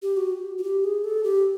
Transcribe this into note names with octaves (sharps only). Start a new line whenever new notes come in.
G4
F#4
F#4
G4
G#4
A4
G4